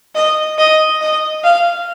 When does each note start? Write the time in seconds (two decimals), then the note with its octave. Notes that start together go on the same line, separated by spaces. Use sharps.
0.15 D#5
0.58 D#5
1.01 D#5
1.44 F5